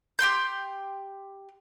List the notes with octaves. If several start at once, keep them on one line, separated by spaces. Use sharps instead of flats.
G4 G5 C6 G6